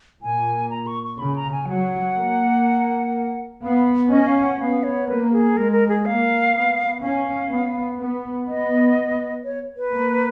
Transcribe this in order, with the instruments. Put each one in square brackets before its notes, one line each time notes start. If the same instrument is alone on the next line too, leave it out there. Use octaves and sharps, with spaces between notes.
[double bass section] A#2 [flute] G#5
[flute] A#5
C#6
C#6
[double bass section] C#3 [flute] B5
[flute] A#5
G#5
[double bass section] F#3 [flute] F#5
[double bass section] A#3
[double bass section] B3 [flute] F5
[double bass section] C#4 [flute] D#5
[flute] F5
F#5
[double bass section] B3 [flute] F5
[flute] C#5
[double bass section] A#3 [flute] B4
[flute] G#4
[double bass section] G#3 [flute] A#4
[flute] A#4
G#4
[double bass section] A#3 [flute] F5
[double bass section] B3
[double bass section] C#4 [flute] F5
[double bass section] B3
B3
[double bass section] B3 [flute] D#5
[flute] C#5
B4
[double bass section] A#3